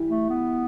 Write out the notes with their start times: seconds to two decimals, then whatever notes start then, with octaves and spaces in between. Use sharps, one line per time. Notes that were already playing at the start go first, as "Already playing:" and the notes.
Already playing: E3 G3 E4
0.10 A3
0.30 B3